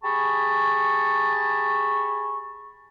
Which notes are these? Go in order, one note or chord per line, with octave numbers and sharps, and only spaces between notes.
G4 G#4 G#5 A5 B5 C#6